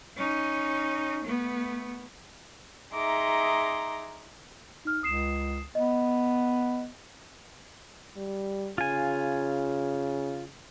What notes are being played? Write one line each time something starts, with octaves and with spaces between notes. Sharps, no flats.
C#4 D#4
A3 B3
D#4 G#4 E5 A#5 C6 D6
D#4 F6
C#2 D#6 C7 E7
B3 D#5
G3
C#3 F4 G#5